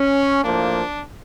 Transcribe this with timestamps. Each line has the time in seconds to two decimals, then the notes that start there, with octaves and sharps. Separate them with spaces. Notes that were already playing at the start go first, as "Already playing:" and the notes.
Already playing: C#4
0.44 A2 F3 A#3 D4